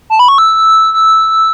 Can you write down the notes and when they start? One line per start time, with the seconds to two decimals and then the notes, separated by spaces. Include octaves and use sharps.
0.10 A5
0.19 B5
0.28 C#6
0.38 E6
0.94 E6